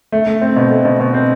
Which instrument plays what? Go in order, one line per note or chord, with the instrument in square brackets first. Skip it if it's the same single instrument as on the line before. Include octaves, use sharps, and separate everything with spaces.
[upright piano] A3
A3
C4
B2
A3
B2
B2
C4